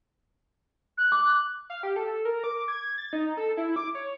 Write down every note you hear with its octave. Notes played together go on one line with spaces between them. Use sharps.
F#6
D6
F5
G4
A4
A#4
D6
G#6
A6
D#4
A4
E4
D6
C#5